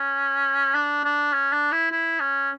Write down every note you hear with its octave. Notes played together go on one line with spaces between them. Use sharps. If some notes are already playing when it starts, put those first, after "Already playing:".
Already playing: C#4
D4
D4
C#4
D4
E4
E4
C#4